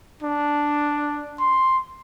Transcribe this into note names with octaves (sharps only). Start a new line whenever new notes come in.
D4
C6